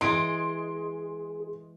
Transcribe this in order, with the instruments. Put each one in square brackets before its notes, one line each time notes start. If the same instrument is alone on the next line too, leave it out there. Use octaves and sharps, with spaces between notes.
[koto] E3 G#3 [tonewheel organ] G#4 [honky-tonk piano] C6 D7